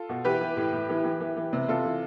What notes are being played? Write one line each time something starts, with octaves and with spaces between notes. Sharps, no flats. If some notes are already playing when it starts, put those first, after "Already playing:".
Already playing: F4 A4
B2
E3 G4 B4
E3
A2
A2
E3
E3
E3
E3
C3
C3 F4 A4
E3